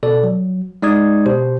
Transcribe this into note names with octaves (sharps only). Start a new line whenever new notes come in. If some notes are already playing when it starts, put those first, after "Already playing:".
B2 A4 D5
F#3
G#3 D#4 D5 D#6 G#6
B2 G4 C5